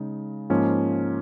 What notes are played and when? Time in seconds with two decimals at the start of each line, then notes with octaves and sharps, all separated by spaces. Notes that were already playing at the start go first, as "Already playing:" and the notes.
Already playing: C#3 G#3 D#4
0.50 G#2 F3 A#3 C#4